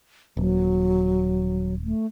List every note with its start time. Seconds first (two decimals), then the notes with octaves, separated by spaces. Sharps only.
0.37 D#1 F#3
1.85 A3